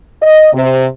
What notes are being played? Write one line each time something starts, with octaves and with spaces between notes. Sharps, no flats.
D#5
C3